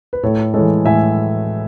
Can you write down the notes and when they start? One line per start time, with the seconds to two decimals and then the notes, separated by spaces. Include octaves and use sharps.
0.13 B4
0.23 A2 A4 C#5
0.54 E3 G#3 A4 C#5
0.85 A2 E5 G#5